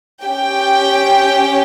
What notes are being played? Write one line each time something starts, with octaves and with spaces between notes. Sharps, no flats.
C#4 G4 G5